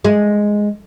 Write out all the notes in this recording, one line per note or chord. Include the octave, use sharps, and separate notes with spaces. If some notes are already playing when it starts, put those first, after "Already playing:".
G#3